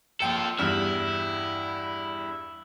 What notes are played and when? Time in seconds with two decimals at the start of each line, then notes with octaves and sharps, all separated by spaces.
0.20 A#1 F4 A4 G5 C#7
0.59 E2 G2 E4 F6